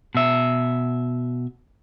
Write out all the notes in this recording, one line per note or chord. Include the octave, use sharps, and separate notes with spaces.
B2 E5